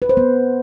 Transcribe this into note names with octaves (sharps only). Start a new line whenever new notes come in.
B4
C5
B3